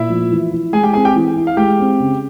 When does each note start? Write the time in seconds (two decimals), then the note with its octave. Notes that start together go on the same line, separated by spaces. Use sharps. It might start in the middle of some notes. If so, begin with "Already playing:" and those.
Already playing: A#2 E4 E5
0.09 F3
0.31 E3
0.51 E4
0.73 G#3 G#4 G#5
0.84 G4 G5
0.93 C4 G#4 G#5
1.05 G4 G5
1.16 E3
1.36 E4
1.47 F5
1.57 G#3 G4 G5
1.79 C4
2.00 C#3